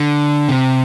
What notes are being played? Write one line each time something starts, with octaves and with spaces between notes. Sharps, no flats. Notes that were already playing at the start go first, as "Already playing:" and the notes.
Already playing: D3
C3